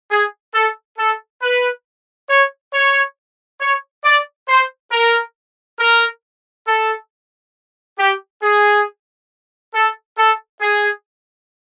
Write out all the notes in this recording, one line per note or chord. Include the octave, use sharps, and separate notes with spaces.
G#4
A4
A4
B4
C#5
C#5
C#5
D5
C5
A#4
A#4
A4
G4
G#4
A4
A4
G#4